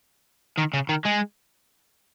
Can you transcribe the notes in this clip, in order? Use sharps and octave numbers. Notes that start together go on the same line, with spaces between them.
D#3
C#3
D#3
G#3